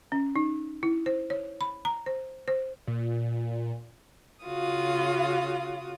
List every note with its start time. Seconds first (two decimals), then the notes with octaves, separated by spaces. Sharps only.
0.12 C#4
0.36 D#4
0.83 E4
1.06 C5
1.30 C#5
1.61 B5
1.85 A#5
2.06 C5
2.48 C5
2.87 A#2
4.46 C#3 F4 F#4 F5 D#6